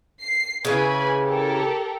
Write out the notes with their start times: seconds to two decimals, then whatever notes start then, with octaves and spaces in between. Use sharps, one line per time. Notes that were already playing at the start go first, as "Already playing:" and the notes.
0.21 C7
0.65 C#3 E3 B4 G#5 B5
1.23 G4 A4 A#4